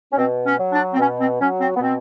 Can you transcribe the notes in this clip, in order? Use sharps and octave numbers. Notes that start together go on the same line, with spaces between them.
C#4
B2 C4
C#4
F#3
D4
C4
B2 C#4
C4
F#3 C#4
C4
B3
B2 C4